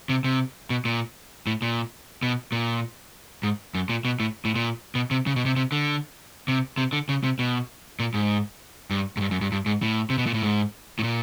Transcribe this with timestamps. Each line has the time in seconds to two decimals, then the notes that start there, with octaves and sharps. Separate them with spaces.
0.09 C3
0.24 C3
0.70 B2
0.85 A#2
1.47 A2
1.62 A#2
2.23 B2
2.52 A#2
3.43 G#2
3.74 F#2
3.89 A#2
4.05 B2
4.20 A2
4.45 A2
4.55 A#2
4.95 B2
5.11 C3
5.27 C#3
5.36 B2
5.46 C3
5.56 C3
5.72 D3
6.48 C3
6.78 C3
6.93 D3
7.09 C#3
7.24 C3
7.39 B2
8.00 A#2
8.14 G#2
8.90 G2
9.17 G#2
9.21 G2
9.31 F#2
9.41 G2
9.52 G2
9.66 G#2
9.82 A2
10.10 C3
10.18 B2
10.26 A#2
10.34 A2
10.43 G#2
10.99 A2
11.03 A#2